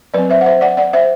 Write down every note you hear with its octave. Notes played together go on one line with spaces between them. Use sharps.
F#3 C4 B4 D5
C5 E5
F#5
C5 E5
D5 F#5
D5 F#5
C5 E5